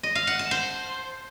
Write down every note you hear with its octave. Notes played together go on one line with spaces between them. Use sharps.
D#5
F5
F#5
A5
C5